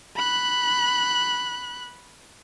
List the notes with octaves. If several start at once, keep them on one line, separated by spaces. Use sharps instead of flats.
B5 F#6